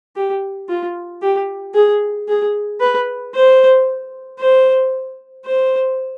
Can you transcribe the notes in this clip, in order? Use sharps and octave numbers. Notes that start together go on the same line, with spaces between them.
G4
F4
G4
G#4
G#4
B4
C5
C5
C5